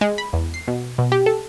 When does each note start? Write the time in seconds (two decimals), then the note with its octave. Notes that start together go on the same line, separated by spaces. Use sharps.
0.01 G#3
0.18 B5
0.33 E2
0.54 C7
0.68 B2
0.98 B2
1.12 G4
1.26 A4